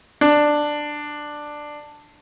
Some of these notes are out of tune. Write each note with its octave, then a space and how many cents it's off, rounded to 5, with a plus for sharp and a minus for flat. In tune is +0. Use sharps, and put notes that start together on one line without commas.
D4 +10